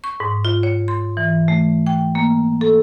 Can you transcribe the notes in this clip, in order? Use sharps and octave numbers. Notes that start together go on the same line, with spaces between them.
C#6
G#2
F4
C#5
C6
E3
A3
G5
A#3
A4